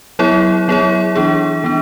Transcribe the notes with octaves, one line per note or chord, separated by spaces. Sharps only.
F#3 B3 E4 G#4 C#5
F#3 B3 E4 G#4 C#5
E3 B3 D4 G#4
E3 B3 D4